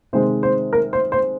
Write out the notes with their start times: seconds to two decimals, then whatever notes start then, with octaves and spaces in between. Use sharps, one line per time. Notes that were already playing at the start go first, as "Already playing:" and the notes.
0.13 C3 D#3 G#3 C4 C5
0.43 C5
0.73 A#4
0.93 C5
1.12 C5